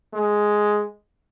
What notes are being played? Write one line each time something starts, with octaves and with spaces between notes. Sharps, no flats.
G#3